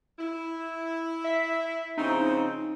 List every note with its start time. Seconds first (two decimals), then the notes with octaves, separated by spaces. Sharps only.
0.19 E4
1.24 E5 B6
1.97 C#3 F3 C4 D#4